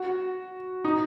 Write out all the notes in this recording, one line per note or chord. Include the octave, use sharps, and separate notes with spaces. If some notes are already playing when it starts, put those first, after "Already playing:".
Already playing: F#4
D#4